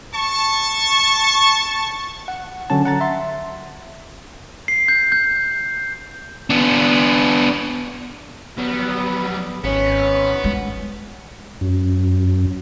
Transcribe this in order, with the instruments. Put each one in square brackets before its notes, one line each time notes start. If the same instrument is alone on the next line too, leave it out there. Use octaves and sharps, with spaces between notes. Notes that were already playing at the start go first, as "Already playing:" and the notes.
[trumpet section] A5 C#6
[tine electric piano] F#5
D3 F#3 C#4 A5
F#5 A#5 A6
E5 C6
[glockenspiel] C7
G6
G6
[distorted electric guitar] B3 D4
[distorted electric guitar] F#3 G3 [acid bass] B3
[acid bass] G#1 [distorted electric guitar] B3 [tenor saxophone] C#4
[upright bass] G#3 F4
[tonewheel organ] F#2